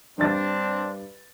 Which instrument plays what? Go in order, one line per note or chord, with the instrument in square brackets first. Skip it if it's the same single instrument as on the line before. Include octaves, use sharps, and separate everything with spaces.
[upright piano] G2 A6 [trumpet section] C4 D4